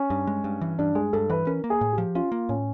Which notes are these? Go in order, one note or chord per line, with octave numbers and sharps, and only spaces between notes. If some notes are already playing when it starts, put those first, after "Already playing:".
Already playing: C#4
G2
G#3
G2
E3
G2 D4
G#3 G#4
G2 A4
E3 B4
C#4 A#4
A#3
G#4
A2
G4
F3
C#4 F4
A#3
A2 C#4